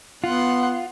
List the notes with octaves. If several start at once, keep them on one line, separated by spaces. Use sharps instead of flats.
B3 F4 F#5 C6